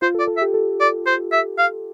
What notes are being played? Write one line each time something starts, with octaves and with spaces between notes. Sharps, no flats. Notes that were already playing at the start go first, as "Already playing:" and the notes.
F4 C5
A4
D5
A4
E5
G4
A4
D5
C5
E5
F5